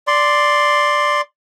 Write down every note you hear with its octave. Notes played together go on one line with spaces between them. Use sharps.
D5 C6